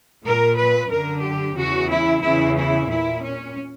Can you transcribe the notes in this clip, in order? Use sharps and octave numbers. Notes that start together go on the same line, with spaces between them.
A#2 A#4
B4
F#2 D3 A#4
G4
E2 C#3 E3 F#4
E4
E2 C#3 E3 E4
E4
A#2 E4
C#4